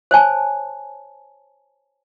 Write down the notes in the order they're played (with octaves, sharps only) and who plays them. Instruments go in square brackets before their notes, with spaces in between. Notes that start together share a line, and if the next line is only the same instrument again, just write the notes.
[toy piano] C5 C#5 G#5 A5